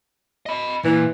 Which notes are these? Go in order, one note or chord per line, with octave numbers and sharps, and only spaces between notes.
D#5 B5
A#2 E3